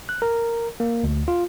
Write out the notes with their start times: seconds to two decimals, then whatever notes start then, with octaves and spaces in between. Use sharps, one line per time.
0.09 F#6
0.22 A#4
0.80 A#3
1.04 D2
1.28 F4